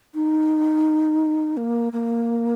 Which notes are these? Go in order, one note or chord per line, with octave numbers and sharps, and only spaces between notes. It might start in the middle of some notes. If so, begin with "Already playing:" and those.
D#4
A#3
A#3